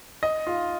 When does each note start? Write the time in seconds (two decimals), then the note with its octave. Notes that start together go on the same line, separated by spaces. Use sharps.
0.23 D#5
0.47 F4 F5